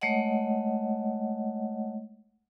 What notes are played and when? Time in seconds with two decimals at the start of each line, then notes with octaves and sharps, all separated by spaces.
0.01 G#3 A3 C#5 D#5 F#5